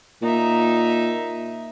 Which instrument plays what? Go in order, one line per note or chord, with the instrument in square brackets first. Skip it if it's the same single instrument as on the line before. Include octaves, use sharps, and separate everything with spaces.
[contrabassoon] A#2 [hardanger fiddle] D#4 E5